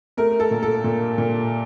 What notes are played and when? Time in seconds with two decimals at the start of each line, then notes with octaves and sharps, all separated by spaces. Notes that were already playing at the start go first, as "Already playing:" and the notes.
0.17 A3 A#4
0.40 A4
0.51 A#2
0.63 A4
0.84 A#2
1.18 A#2